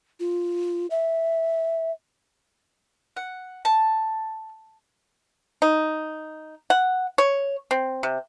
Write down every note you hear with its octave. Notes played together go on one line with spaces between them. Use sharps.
F4
E5
F#5
A5
D#4
F#5
C#5
C4
C3